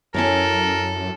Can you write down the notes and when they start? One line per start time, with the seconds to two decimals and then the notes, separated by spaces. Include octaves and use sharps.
0.14 F#2 C#4 E4 A4 A#4 C#5